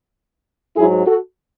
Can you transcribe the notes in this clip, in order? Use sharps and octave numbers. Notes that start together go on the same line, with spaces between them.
G#2 F#3 E4 G#4
F#4 A4